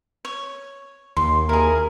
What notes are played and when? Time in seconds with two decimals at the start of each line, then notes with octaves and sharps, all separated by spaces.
0.25 C#5
1.17 D#2 C6
1.49 E4 G#4 A#4